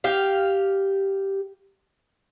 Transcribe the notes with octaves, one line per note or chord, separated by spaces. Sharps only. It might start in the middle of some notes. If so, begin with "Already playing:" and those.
G4 F5